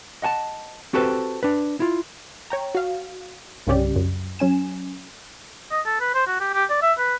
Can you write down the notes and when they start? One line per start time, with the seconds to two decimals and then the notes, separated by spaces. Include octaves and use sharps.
0.22 D#5 F#5 G#5 A5
0.93 C4 F#4 G4 A4 B4 C5
1.43 D4 B4
1.80 E4 F4
2.50 C#5 G5 A#5
2.75 F#4 F5
3.67 C2 G2 C#3 C#4 G4 D5
3.96 F#2
4.39 F#3 C#4 G#5 E7
5.71 D#5
5.86 A4
6.00 B4
6.14 C5
6.27 F#4
6.40 G4
6.54 G4
6.70 D5
6.82 E5
6.98 B4